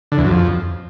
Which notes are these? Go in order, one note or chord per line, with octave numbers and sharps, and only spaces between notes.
D3
E2
F#2
F2